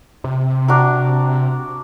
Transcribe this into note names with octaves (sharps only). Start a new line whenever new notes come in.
C3
D4 F#4 A#4